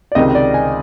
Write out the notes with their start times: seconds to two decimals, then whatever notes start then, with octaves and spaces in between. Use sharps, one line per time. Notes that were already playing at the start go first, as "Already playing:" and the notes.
0.12 D5
0.15 C#2 C3 D#3 D#5
0.35 D5
0.54 G#5